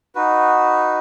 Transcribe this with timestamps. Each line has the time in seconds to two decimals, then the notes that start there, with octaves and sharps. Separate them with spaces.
0.15 D#4 F#4 B4